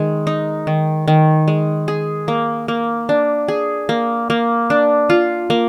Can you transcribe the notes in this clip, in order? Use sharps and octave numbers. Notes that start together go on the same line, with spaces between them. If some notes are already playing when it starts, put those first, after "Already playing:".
Already playing: D#3 G#3
D#4
D#3
D#3
G#3
G#4
A#3
A#3
D4
G#4
A#3
A#3
D4
F4
A#3